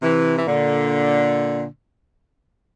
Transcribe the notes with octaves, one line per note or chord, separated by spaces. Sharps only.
C3 E3
E3
A#2 D3